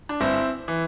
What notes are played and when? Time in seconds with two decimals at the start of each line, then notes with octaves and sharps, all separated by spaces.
0.09 D4
0.20 G1 C4 E4
0.68 E3